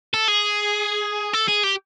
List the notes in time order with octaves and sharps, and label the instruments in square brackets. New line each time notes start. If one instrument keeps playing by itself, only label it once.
[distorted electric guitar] A4
G#4
A4
G#4
G4